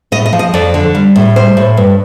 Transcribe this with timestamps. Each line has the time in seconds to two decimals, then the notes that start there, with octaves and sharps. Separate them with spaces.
0.12 A2 D#5
0.26 D#5
0.33 F3
0.39 D#5
0.54 F2 D5
0.74 D3
0.95 G3
1.16 A2
1.36 G3 C5
1.57 A2
1.77 G2